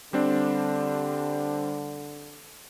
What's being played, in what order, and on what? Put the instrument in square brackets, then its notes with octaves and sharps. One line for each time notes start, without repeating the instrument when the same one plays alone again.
[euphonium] D3 [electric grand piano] G3 C4 D4